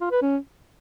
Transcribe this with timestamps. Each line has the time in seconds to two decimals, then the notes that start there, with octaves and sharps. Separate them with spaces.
0.01 F4
0.11 B4
0.22 C#4